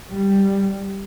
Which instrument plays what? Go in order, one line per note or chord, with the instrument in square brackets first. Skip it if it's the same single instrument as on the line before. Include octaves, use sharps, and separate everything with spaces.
[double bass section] G3